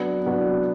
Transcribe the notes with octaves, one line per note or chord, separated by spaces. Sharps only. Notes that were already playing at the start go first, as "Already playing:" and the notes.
Already playing: F#3 B3 D4
F#3 B3 D4